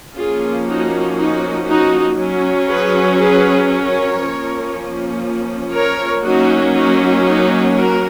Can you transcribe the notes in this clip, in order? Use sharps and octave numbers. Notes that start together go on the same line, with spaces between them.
F3 A#3 C#4 F4 G#4
D#4 F#4
D#4 F#4
D#4 F#4
F#3 C#4
G#4 B4
G#4 B4
A#4 C#5
F3 A#3 C#4
A#4 C#5
F#3 A#3 C#4 D#4 F#4
D#4 F#4
D#4 F#4
F#4 A#4